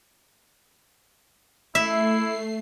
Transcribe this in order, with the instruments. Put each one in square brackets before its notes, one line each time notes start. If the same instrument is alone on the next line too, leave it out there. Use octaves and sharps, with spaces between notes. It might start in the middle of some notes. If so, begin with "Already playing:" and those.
[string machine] A3 C7 [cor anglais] E4 [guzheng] E5